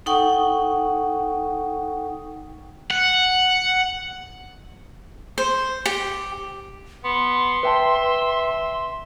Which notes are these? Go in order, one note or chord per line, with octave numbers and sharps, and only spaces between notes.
D#4 A4 F#5 G5 C#6 D#6
F#5
C5
G4
B3 C6
B4 E5 G5 A5